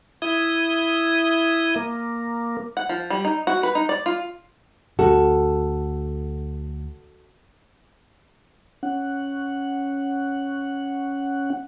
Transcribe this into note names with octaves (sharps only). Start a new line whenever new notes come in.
E4 D#6
A#3
F#5
F3
G3
D#4
F#4
B4
D#4
D5
F4
D2 F#4 A4
C#4 F#5